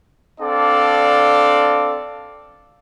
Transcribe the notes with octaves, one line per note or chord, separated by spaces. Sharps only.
C4 D4 A4 D5 F5